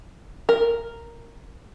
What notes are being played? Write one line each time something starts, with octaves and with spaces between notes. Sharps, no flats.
A#4